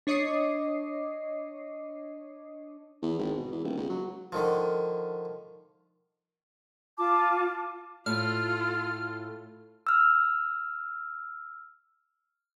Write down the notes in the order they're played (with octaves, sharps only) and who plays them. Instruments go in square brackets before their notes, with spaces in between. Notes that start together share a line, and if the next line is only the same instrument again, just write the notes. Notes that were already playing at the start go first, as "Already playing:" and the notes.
[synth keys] D4 C#5 D#5 D6 D#6 C7
[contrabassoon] E2
G#1
B2
E2
D#1
C#2
F#3
[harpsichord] D3 D#3 F3
[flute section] F4 A5 D6
[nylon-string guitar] A2 [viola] F4 A4 [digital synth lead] F6
[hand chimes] E6 F6